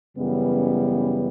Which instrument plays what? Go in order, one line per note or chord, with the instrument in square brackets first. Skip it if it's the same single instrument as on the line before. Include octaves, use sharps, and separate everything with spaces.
[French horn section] F#2 C#3 E3 G3 B3